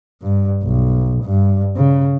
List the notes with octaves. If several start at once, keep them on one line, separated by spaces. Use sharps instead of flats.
G2
B1
G2
C#3